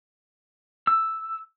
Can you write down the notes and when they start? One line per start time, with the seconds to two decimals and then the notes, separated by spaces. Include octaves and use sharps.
0.87 E6